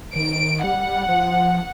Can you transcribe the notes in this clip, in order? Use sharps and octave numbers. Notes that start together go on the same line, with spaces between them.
D#3 D7
G3 F#5
F3